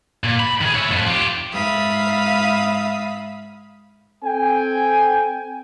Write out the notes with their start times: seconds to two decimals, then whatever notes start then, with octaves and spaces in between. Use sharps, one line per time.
0.24 A#2
0.40 B5
0.61 D#3 G#4
0.74 E4 C#5
0.91 F2 A2
1.07 F4 G4
1.54 G#2 E5 F5 B5 D#6
4.24 C4 A4 G5 G#5